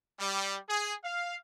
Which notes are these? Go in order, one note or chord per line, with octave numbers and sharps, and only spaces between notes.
G3
G#4
F5